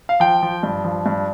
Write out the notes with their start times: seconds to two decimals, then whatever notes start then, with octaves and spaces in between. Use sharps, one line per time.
0.09 F5
0.20 F3 G5
0.42 F3
0.63 G2
0.84 F3
1.06 G2